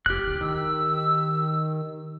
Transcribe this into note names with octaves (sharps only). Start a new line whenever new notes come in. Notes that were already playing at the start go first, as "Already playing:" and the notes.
F1 G4 F6 F#6
D1
D#3 E6